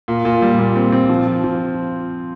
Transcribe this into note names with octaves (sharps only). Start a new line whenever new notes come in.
A#2
A#2
G3
A#2
C4
C4
F3
F3
F3